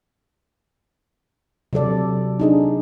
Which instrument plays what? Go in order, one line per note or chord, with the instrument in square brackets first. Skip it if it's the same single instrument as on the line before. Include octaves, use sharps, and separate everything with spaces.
[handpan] C3 F#3 A4 D5
D4 D#4 G#4